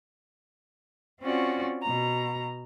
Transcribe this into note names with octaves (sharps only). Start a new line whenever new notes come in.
C4 C#4 F4 F#4 D5
B2 A#5